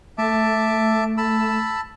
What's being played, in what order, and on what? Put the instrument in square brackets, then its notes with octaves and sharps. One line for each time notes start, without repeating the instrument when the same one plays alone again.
[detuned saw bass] A3 [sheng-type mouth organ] E5 A5 D6
[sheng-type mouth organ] A5 B5 E6